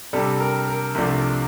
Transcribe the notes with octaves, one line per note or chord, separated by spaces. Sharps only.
C3 G3 D4 A4
A#4
A#4
C2 C3 F3 A3 D4